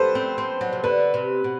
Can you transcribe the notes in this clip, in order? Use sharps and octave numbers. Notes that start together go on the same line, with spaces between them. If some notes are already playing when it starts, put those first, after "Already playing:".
Already playing: G4 A4 B4 C5
C4
C4
F#3
C3
D3 B4
C3
B2